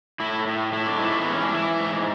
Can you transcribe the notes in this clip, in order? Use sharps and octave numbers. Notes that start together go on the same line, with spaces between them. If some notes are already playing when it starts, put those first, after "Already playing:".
A2 E4
A2
A2 E4
D4
G#2 E4
A3
E3 B3
C#4
D4
E3 E4
G#2